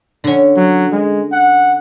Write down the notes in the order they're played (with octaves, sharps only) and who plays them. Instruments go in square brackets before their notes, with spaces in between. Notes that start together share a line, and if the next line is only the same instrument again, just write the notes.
[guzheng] D3 C#4
[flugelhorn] F#3
G#3
F#5